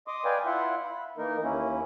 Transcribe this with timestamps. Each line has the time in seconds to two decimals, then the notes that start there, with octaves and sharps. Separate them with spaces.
0.07 D#5 C6 D6 D#6
0.25 B4 D5 F5 G5 G#5
0.46 E4 F4 E5 F#5 C6
0.84 B5
1.17 E3 A#3 D#4 A#4
1.43 D#2 A#3 C#4 E4